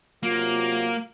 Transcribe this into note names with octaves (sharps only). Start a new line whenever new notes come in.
C3 F#3 A#3 F4